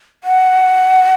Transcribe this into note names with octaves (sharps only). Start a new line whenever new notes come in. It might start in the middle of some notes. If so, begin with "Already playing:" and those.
F#5